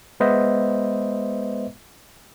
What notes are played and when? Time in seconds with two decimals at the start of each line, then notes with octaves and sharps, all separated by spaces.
0.20 G#3 B3 B4 C5 D#5 E5